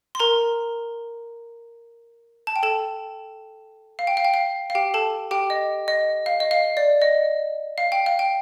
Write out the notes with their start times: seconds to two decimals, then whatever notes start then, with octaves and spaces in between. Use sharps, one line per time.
0.15 C6
0.20 A#4 A#5
2.47 A5
2.56 G5
2.63 A4 A5
3.99 F5
4.07 G5
4.17 F5
4.25 G5
4.34 F5
4.70 F5
4.75 G4 G5
4.94 A4 A5
5.31 G4 G5
5.50 D#5
5.88 D#5
6.26 F5
6.40 D#5
6.51 F5
6.77 D5
7.02 D#5
7.78 F5
7.92 G5
8.06 F5
8.19 G5